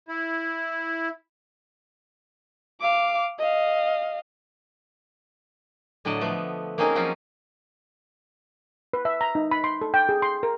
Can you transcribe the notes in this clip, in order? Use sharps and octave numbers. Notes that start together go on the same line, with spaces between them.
E4
F5 D6
D#5 F5
A2 D3 F#3 D5 D#5 A5
F3 A3 B3
A#3 C4 C#4 D#4 G#4 A#4
F3 F#3 C4 C#4 D#4 F4
B4
E5
A#5
D#4
B5
C6
A4
G5
G#4
C6
A#4